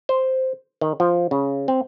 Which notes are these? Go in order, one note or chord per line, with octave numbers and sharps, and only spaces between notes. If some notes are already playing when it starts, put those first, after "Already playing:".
C5
D#3
F3
C#3
C4